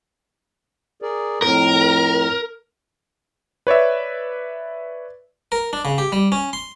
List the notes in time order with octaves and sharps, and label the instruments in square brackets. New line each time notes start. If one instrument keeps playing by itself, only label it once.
[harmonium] G#4 A#4 D5
[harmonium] F2 A2 [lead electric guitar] A#4
[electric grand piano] B4 C#5 D5 E5
[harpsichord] A#4
D4
C#3
G4
G3
C#4
C6